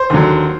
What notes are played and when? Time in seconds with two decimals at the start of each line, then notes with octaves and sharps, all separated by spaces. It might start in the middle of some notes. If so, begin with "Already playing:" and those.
Already playing: C5
0.10 D#2 D3 F#3